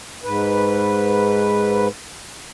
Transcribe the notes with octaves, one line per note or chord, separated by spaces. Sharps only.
G#2 B4